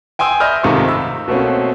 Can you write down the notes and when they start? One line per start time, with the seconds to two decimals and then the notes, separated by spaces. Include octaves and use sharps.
0.19 G5 G#5 C6 D#6 E6
0.40 D#5 E5 B5 D#6 F6 G6
0.64 G#2 C3 D#3 A3 F4 C#6
0.88 B5 E6
1.28 B2 A3 A#3 C4 C#4